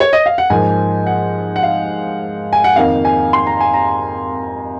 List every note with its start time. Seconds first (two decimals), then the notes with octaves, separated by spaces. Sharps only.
0.00 C#5
0.13 D#5
0.26 F5
0.38 F#5
0.50 G#2 F3 A#3 G#5
1.07 F#5
1.56 F#5
1.63 F5
2.53 G#5
2.64 F#5
2.76 F2 D#3 A#3 F5
3.05 G#5
3.33 C6
3.47 A#5
3.61 G#5
3.74 A#5